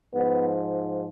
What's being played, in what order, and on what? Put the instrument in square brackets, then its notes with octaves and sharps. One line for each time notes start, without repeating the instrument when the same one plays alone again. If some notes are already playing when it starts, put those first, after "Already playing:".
[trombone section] G#2 F3 B3